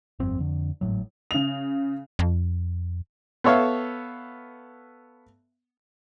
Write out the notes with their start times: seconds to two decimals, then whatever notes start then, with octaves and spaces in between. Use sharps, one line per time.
0.19 G1 F2 C4
0.38 F2 D3
0.81 G#1 A2 F#3
1.31 C#3 F7
2.19 F2
3.44 B3 A4 C#5 E5 F5